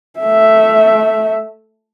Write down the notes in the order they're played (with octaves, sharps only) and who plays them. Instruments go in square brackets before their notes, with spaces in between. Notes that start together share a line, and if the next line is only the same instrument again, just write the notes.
[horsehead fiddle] A3 E5